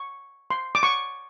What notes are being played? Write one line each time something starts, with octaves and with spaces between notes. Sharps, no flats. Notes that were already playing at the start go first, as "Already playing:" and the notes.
Already playing: C#6
C6
D6
C#6